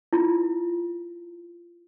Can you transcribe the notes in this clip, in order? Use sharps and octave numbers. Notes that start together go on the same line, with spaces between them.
E4 F4